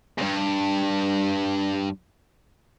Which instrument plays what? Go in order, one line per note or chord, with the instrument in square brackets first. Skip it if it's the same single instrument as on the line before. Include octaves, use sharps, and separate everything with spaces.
[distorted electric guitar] E2 G2